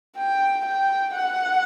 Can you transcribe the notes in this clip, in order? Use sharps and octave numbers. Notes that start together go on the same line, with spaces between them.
G5
G5
F#5